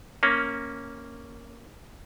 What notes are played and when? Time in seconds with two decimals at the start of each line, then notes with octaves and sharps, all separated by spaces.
0.23 A#3 C#4